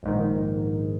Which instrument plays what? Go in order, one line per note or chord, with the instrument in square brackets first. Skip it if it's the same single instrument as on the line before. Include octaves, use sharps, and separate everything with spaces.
[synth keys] A#1 G#2 D#3